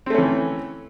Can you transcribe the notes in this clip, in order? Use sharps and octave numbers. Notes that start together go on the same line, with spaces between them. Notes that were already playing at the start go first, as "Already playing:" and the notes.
E3 A3 C4 C#4